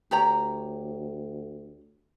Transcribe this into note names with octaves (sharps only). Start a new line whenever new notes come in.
D2 G4 C#5 A#5